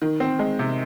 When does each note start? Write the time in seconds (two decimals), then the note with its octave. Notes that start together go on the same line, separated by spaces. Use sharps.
0.02 D#3
0.20 C4
0.39 G#3
0.59 C3